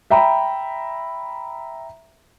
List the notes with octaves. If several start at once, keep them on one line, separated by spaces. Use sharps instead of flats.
E5 G5 A#5 B5